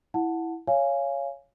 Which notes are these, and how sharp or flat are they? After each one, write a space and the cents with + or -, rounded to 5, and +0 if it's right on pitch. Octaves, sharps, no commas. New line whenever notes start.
E4 +0 F#5 -10 A5 +0
C#5 +5 F5 -15 G#5 +0